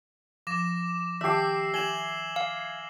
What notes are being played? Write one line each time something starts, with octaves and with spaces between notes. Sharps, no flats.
F3 D6 A#6 E7
D#3 G4 E5 A5 D6 E6 C7
G#5 E7 F#7 G7
F5